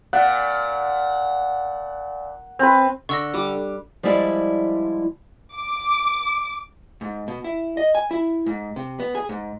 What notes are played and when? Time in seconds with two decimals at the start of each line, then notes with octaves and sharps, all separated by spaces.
0.13 A#2 F#5
2.59 C4 B4
3.09 D3 C#6 E6 A#6
3.34 G3 D6
4.03 F3 G3 G#3 E4 D5
5.54 D6
7.01 G#2
7.28 B2
7.44 E4
7.77 D#5
7.95 G#5
8.11 E4
8.46 G#2
8.76 C3
9.00 B3
9.15 G#4
9.29 G#2